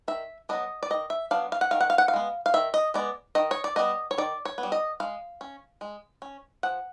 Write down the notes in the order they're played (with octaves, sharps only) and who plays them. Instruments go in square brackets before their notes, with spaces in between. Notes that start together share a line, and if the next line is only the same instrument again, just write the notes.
[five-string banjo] D#3 E5
F#3 B3 D4 D#5
D5
D#3 D#5
E5
F#3 B3 D4 F5
F5
F#5
D#3 F5
F#5
F5
F#5
F5
G#3 B3
F5
D#3 E5
D#5
G#3 B3 D5
D#3 D#5
C#5
D5
G3 B3 D#5
C#5
D#3 D5
C#5
B3
G3
D#5
G#3 F5
C#4
G#3
C#4
F3 F#5